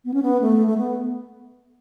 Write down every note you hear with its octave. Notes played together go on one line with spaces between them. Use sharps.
B3
C#4
B3
A3
A3
B3